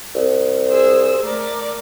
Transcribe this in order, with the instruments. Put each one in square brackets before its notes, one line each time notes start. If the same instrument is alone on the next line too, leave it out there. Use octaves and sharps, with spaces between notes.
[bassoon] C2
[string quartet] G#4 C5 E6
A3 A#4 D5